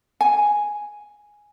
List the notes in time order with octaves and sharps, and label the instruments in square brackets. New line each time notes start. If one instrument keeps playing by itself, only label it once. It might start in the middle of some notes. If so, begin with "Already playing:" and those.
[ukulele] G#5